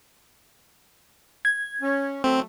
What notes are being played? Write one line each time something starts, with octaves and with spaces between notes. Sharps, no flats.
G#6
C#4
F#3 A3 C4